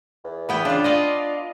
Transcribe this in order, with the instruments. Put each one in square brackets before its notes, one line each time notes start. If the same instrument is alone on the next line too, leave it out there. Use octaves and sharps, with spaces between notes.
[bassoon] E2
[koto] E3 B3 G5
[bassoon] C#3 [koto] D4 F4
[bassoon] D4 [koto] F4 D5 D#5